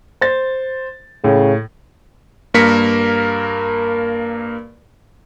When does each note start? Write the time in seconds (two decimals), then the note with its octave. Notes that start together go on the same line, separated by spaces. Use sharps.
0.21 C5 A6
1.24 A2 C#3
2.54 G2 A#3 A#4 B6 C#7